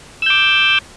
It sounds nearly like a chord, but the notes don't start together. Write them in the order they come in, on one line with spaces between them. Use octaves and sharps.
E6 G6 D6